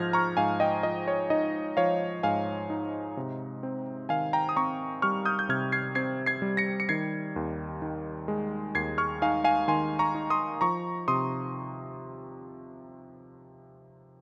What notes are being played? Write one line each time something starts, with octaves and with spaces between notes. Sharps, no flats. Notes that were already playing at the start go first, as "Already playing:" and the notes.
Already playing: G#2 F3 F6 G6 G#6 A#6
A#5 C#6
G#2 F5 G#5
D#5 G5
F3 D#5
C#5
D#4 D#5
F3 C#5 F5
G#2 F5 G#5
D#4
C3
C4
D#3 F5 G#5
G5 A#5
D#6
C4 A#5 C#6
G3 C#6 F6
D#6 G6
G6
C3 F6 G#6
G#6 C7
C4 G#6 C7
G#6 C7
G3
A#6 C#7
C#7
D#3 G#6 C7
D#2
D#3
G#3
D#2 G#6 C7
C#6 F6
D#4 F5 G#5
F5 G#5
D#3 G#5 C6
A#5 C#6
D#4
C6 D#6
F3 A#5 C#6
C3 C6 D#6